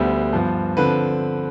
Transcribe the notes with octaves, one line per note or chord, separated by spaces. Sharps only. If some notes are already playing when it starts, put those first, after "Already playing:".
Already playing: D2 D3 G3 B3 C5
G2 F3 B3
D3 F3 C4 B4